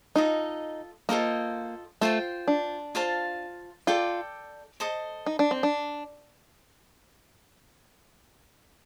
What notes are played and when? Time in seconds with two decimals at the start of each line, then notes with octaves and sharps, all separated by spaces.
0.16 D#4 F4 A4 D#5
1.09 A#3 F4 A4 C5 D#5
2.01 A3 F4 C5 G5
2.48 D4
2.95 F4 C5 F5 A5
3.87 F4 A4 D5 G5 D6
4.80 A4 C5 D#5
5.26 D#4
5.39 D4
5.51 C4
5.63 D4